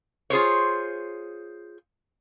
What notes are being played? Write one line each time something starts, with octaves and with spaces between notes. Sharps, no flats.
F4 G#4 C5 C#5